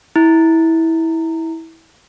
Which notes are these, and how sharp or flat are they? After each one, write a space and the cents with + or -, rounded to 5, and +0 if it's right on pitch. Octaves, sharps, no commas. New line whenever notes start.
E4 -20